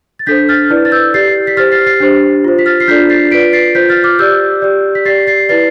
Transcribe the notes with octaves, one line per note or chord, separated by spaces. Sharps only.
A6
D4 A4 C5 G6 B6
F6 A6
E4 B4 D5
A6
E6 G6
G4 D5 A6 C7
B6
G4 C5 F6 A6
A6 C7
A6 C7
D4 G4 C5
F4 C5
B6
F6 A6
C7
D4 F4 A4 D5 G6 B6
A6 C7
F4 B4 D5 B6 D7
A6 C7
F4 C5 G6 B6
F6 A6
D6 F6
G4 D5 E6 G6
G4 D5
B6
G4 D5 A6 C7
A6 C7
E4 B4 D5 A6 C7